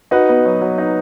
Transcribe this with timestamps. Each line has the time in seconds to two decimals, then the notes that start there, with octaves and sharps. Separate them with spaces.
0.11 D#4 F#4 B4
0.29 B3
0.45 F#3
0.61 F#3
0.78 D#4